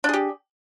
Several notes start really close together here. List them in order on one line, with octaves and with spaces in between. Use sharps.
D4 G#4 G4